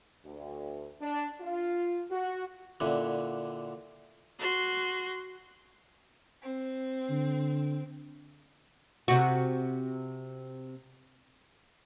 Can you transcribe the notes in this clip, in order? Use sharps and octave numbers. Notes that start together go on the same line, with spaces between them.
D2
D4
F4
F#4
A#2 D3 C#4 E4 F#4
F#4 C6
C4
D3
C3 F#4